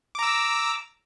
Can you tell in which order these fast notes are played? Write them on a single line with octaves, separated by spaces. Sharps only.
D6 A#5 E6